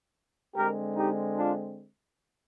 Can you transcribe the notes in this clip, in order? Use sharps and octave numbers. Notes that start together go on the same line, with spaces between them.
D3 G#3 C4 G4 A#4
D#4 G4
D4 F4